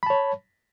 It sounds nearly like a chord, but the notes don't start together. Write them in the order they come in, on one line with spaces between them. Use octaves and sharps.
B5 A5 C#5